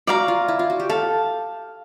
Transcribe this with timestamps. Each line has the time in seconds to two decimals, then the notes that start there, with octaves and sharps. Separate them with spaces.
0.07 F#4 D5 F5 A#5
0.28 F4
0.48 E4
0.59 F4
0.70 F#4
0.80 G4
0.90 A4 F5